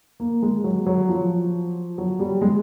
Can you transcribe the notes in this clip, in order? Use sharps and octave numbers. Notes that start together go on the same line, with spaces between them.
A#3
G#3
F#3
F#3
F3
F#3
G3
G#3